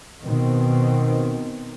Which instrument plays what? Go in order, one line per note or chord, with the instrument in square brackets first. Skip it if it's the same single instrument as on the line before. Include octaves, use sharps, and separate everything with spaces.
[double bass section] B2 D#3 C4